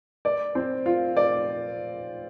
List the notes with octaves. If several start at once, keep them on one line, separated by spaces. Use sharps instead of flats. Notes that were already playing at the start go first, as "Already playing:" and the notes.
D5
C4
F4
D5